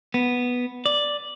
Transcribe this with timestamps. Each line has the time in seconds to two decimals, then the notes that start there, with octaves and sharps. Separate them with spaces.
0.14 B3
0.86 D5